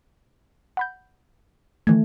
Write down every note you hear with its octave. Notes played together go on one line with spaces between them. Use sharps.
F#5 B5 G6
D#3 E3 A3 G#6